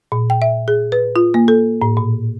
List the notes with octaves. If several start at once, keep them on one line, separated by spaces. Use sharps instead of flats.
A#2
G5
E5
G#4
B4
F4
A#3
A4
A2
A#2